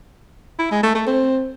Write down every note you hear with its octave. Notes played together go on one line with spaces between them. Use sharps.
E4
G#3
A3
A3
C4